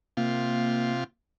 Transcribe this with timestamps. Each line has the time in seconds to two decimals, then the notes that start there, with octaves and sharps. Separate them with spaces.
0.17 C3 A#3 F4